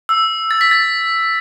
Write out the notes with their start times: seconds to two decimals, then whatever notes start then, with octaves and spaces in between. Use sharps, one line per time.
0.09 E6
0.51 A6
0.61 B6
0.71 A6